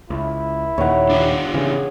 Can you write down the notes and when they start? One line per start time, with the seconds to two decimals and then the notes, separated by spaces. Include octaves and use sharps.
0.10 C#2 E4
0.78 D#2 A#2 D#3 C#5 F#5
1.10 D4 F4 G4
1.54 C#3 E3 G#4